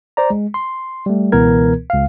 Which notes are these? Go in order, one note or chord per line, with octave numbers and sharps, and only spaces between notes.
C5 D5 A#5
G#3
C6
G3 A3
C#2 B2 E3 B3 A#4 G#6
C#2 F5